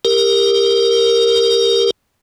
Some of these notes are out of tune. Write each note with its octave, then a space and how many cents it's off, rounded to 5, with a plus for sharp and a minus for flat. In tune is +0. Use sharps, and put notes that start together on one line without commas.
G4 +25 A#4 +0